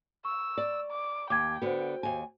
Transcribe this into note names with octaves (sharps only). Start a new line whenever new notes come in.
C#6 E6
D5
D6
D#2 G5 D6 G#6
D3 B3 F#4 C5
D#2 G#5